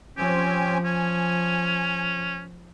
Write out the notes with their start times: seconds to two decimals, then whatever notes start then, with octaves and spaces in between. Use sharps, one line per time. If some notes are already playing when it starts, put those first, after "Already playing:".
0.17 F3 C4 C#4 G4 G#5
0.85 C#4 G#5